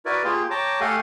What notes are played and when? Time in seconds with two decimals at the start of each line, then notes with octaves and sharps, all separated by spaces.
0.06 E4 F#4 A#4 B4 D5
0.24 A#3 F4 G4 G#4
0.51 C#5 G5 A5 A#5 D6
0.81 A3 G4 A4 F5 F#5 G#5